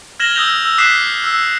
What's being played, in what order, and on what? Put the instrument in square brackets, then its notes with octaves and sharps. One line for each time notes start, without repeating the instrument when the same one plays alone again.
[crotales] F6 G#6 A#6 E7 F#7 G7
D#6 E6 G6 A#6 F7
E6
D6 D#6 F#6 B6 C7 E7
E6